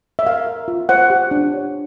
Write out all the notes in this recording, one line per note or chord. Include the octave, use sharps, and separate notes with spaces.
E5
A#4 F5
A#4
F4
C5 F#5
G4
D4
C#5